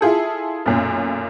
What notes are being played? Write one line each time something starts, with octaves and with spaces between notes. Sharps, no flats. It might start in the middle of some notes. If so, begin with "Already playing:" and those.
E4 F4 G#4 A4
B1 F#2 A#2